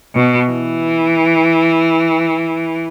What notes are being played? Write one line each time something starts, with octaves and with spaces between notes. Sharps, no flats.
B2
E3